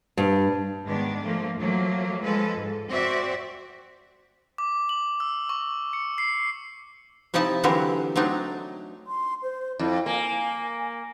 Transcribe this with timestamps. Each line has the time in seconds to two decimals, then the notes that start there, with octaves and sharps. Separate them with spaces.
0.17 G2
0.85 G#2 D#3 G#3 B3 D4
1.22 F3 A3 A#3
1.59 F3 F#3 A3 A#3
2.21 F3 G#3 A4 B4
2.58 G#2
2.88 C4 F#4 C5 D5 E5
4.58 D6
4.89 F#7
5.20 E6
5.49 C#6
5.93 C#7
6.18 C7
7.34 C3 F3 D#4 E4 A5
7.63 D3 E3 F#3 C4 G4 A#4
8.16 F#3 A3 C4 D4 D#4
9.07 C6
9.43 C5
9.79 F2 E4
10.06 A#3 G#5